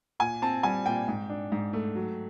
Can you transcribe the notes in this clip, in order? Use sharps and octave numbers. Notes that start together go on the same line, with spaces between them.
A#2 G#5
C4 A5
G3 G#5
A#2 G5
G#2
D4
G#2
A3
F#3